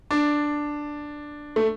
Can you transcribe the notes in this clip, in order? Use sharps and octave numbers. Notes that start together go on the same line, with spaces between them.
D4
A3